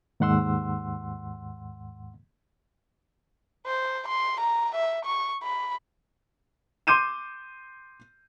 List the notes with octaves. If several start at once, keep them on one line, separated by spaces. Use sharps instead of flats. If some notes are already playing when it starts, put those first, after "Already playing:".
D#2 G#2 F#5 C6 E6
C5
C6
A#5
E5
C#6
B5
C6 D6 G6 D#7 E7